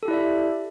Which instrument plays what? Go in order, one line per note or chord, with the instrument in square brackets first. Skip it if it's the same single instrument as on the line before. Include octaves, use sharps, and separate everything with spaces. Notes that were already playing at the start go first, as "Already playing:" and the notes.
[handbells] A4
G4
E4
D5
E5